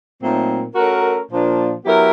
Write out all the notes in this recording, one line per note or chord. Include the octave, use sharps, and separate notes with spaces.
A#2 F#3 A3 C4 D#4
A3 C#4 F#4 A#4
A#2 F3 A#3 D4
F#3 B3 E4 G4 A#4